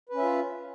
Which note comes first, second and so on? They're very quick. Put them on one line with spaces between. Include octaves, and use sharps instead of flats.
B4 C#4 E5 F4